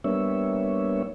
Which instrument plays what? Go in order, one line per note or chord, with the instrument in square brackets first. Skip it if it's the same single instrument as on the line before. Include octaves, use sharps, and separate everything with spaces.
[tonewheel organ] G3 A#3 B3 D4 C#5 E5